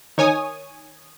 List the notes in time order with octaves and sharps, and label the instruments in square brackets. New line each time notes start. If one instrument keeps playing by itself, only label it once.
[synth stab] D#3 C#5 G#5 D#6